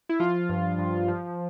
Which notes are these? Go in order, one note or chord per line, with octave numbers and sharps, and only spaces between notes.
E4
F3 F4
G2
G2
F3